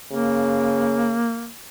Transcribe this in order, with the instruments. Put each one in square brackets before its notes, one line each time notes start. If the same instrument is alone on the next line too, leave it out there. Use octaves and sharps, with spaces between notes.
[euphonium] C#3 [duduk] A#3